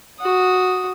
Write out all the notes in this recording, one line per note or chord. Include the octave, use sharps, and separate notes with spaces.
F#4 D#6